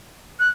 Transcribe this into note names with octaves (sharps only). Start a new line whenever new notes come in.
F#6